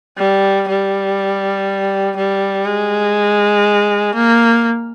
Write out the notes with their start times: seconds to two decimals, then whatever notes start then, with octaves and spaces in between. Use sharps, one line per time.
0.18 G3
0.68 G3
2.17 G3
2.66 G#3
4.15 A#3